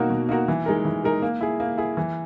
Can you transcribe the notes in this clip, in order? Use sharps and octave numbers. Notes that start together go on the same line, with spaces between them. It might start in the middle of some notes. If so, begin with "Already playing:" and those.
Already playing: B2 A#3 D#4 F#4 A#4
B2
A#3 D#4 F#4 A#4
E3
G#3 D#4 A#4
E3
G#3 D#4 A#4
A#3
E4 G#4
A#3
E4 G#4
E3